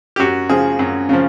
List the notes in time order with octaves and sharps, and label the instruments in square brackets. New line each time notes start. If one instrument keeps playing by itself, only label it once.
[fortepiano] G4
F#2 F#4
C#3 F3 G#4
F#2
C#3 F3